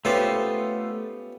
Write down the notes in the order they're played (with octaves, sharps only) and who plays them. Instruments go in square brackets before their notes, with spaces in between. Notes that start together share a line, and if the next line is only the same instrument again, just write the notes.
[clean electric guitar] A3 F4 C5 [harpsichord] B3 C#4 G4